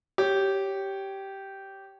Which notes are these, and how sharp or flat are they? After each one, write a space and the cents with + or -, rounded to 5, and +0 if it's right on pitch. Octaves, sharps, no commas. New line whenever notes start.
G4 -10 C#5 +0